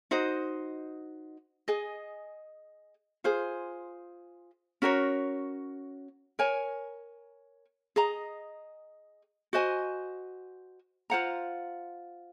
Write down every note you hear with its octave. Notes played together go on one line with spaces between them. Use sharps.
D#4 F#4 C5 D#5
G#4 D#5 G#5
F4 G#4 C5
C#4 F#4 A#4 C#5
A#4 C#5 G#5
G#4 D#5 A#5
F#4 C5 D#5 G#5
F4 C5 F#5 A#5